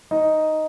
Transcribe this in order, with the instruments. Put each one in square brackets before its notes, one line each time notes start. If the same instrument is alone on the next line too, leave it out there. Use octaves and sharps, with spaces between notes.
[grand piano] D#4 D#5